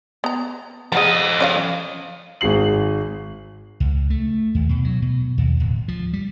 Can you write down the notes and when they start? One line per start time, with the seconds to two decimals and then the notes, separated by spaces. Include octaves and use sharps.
0.24 B3 A#5
0.92 F3 G#4 D#5 F#5 A#5
1.40 C#4 D5 F5
2.41 G#1 G#2 G#4 C7 F#7
3.80 C#2
4.10 A3
4.55 D#2
4.69 B2
4.85 F#3
5.02 B2
5.38 D#2
5.60 D1
5.88 F3
6.13 G3